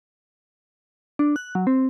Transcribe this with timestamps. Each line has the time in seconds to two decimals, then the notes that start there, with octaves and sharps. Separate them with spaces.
1.19 D4
1.36 F#6
1.55 F#3
1.67 C4